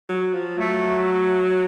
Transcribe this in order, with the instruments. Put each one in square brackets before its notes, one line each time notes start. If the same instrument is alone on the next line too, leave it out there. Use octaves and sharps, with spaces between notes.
[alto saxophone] F#3
F3
[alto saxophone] F#3 [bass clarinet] A3